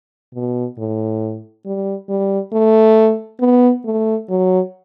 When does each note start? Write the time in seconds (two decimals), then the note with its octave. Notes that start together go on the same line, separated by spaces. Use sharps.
0.35 B2
0.78 A2
1.66 G3
2.09 G3
2.53 A3
3.41 B3
3.85 A3
4.29 F#3